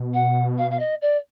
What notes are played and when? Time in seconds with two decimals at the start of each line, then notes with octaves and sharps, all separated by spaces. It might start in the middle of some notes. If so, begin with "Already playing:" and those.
Already playing: B2
0.14 F#5
0.58 F5
0.71 F5
0.79 D#5
1.02 D5